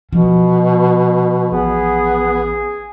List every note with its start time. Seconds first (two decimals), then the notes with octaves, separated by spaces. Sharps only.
0.12 B2 F3
1.52 A1 B3 G#4